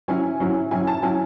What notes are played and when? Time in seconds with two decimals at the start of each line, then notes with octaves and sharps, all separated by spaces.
0.08 F#3 C#4 E4 G#5
0.40 F#3 C#4 E4
0.71 F#3 C#4 E4 G#5
0.87 A5
1.03 F#3 C#4 E4 G#5